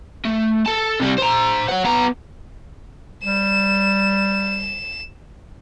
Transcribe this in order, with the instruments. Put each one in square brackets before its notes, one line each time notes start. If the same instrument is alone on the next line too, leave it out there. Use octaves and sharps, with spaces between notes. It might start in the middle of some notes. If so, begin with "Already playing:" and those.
[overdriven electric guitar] A3
A4 A5
C3 G3
C5 A#5
C#5 F#5
B3 A#5
[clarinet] G3 [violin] E7